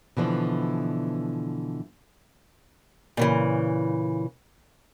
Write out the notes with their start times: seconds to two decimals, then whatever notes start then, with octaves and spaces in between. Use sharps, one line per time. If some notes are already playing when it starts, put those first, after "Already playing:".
0.17 B2 D3 E3 F3
3.17 A#2 C#3 E3